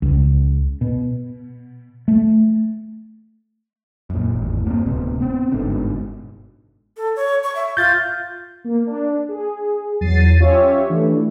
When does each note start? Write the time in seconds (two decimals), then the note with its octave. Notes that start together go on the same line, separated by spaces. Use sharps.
0.02 C#2
0.81 B2
2.08 A3
4.10 F#2 A#2
4.34 G#1 E2 A2
4.65 G2 A#3 C4
4.86 D1 D2 C3 B3
5.21 B3 C4
5.52 G1 G#2 B2 D3
6.97 A4
7.16 C#5
7.44 C#6
7.55 E5
7.77 F4 G6 A6
8.64 A#3
8.87 D4
9.29 G#4
10.01 E2 F#3 A6 C7 D#7
10.38 C#4 F4 G4 C#5 E5
10.89 E3 A3 D4